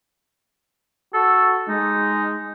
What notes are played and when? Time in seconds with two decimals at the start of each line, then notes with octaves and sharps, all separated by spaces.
1.14 F#4 A4
1.69 G#3 D#4